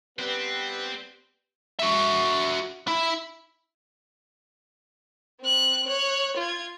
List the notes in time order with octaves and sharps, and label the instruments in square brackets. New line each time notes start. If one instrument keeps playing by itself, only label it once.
[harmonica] G3 B3 [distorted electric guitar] C4 [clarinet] B4
[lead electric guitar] F#4 E5
E4
[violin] C4 F#6
C#5 F#6
F4 G#6